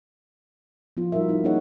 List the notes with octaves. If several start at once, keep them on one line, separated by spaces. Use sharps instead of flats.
F3 B3 F4
G3 D#4 F#4 A#4 E5
D#4 E4
A#3 C#4 D#4 G#4 C#5 F#5